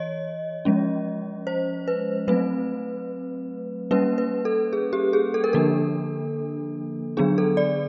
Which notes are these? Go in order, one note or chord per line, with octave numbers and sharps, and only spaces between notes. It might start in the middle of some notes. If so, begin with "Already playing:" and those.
Already playing: E3 C#5 D#5
F3 G#3 C#4
C5
B4
F#3 A3 C4 B4
G3 A#3 C#4 B4
B4
A4
G#4
G4
G#4
A4
A#4
D3 F3 A#3 D4 A4
D3 F#3 B3 D4 G#4
A4
D5